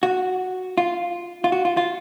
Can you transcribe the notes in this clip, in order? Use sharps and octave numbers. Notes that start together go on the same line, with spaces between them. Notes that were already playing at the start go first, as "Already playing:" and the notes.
F#4
F4
F4
F#4
F4
F4